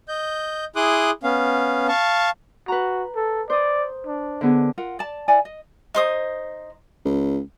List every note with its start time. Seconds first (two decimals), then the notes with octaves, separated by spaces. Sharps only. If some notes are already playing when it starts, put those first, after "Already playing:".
0.08 D#5 G6
0.76 E4 G#4 C6 D6 D#6 F#6
1.23 B3 C#4 F5
1.88 F5 A5 C#6
2.68 F#4 B4 A#5
3.16 A4
3.50 C5 D5 D#6
4.06 D4
4.41 D3 B3 G#4
4.78 F4 A#4 F#5
4.99 D5 A5
5.28 E4 D5 F#5 G#5
5.45 D#5
5.95 D#4 C5 D#6
7.05 C#2